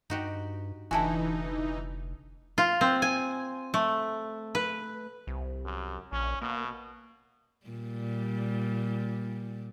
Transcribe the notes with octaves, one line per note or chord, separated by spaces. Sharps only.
G2 D#4 F#4 G4
F1 D3 E3 D#4 E4 F#4 G#5 A5
F4
C4
G#5
A3
B4
C2
F#2
A#1 C#4
B2 A#3
A#2 G3